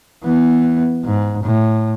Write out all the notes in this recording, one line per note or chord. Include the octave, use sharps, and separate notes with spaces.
E3 B3
G#2
A2